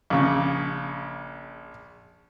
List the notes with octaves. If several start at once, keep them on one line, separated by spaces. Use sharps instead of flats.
A#1 C#3